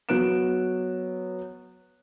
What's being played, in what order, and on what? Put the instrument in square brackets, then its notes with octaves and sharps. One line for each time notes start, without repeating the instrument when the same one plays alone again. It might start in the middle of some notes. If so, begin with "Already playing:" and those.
[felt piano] F#3 B3 F#6 D7 E7